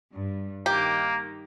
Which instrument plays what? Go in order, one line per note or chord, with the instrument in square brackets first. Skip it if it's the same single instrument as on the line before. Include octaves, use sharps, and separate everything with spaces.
[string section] G2
[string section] D#3 [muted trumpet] A#3 [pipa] G4